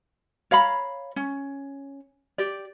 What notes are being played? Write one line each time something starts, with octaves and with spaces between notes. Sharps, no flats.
C#5 F5 A#5 B5
C#4
G4 D5